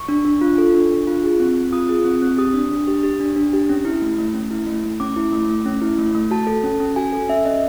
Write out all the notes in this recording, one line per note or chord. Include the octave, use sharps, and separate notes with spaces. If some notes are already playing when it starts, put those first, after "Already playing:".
Already playing: C#6
D4
D4
F4
A4
D4
D4
F4
G#4
C4
C4
F4 D#6
G#4
C4
C4
G4 D#6
D4
D4
G4
G4
D4
D4
G4
C#4
E4
A3
A3
C#4
E4
A3
A3
C#4 D6
E4
A3
A3
C#4
E4
A3
A3
F#4 A5
A4
C#4
C#4
F#4 G#5
A4
C#4 E5
C#4 D#5